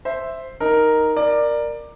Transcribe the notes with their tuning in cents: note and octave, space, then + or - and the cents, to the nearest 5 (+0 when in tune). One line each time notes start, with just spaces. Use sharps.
C5 +0 E5 +0
D#4 +0 A#4 +0
A#4 +0 D5 +15